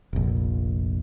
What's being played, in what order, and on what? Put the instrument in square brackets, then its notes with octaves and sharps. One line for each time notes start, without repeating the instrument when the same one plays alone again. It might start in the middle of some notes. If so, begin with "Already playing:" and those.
[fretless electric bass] F1 A#1